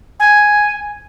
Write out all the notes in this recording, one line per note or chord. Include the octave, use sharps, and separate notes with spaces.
G#5